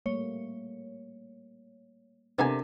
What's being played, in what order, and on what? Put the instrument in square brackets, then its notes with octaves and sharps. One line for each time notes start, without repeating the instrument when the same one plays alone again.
[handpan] G3 A3 A#3 [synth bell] C#5
[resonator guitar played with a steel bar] C3 [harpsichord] B3 D#4 G#5 [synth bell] D4 A4 A#4